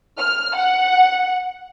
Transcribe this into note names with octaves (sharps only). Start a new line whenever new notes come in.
F6
F#5